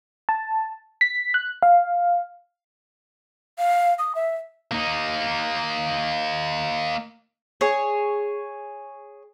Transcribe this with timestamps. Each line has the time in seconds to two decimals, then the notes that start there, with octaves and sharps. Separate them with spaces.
0.29 A5
1.01 B6
1.34 F#6
1.63 F5
3.58 F5
3.99 D#6
4.15 E5
4.72 A#3 D#4
7.61 G#4 C#5